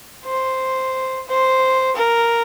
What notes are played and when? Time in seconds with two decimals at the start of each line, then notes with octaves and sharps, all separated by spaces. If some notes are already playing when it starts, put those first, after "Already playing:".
0.25 C5
1.28 C5
1.96 A#4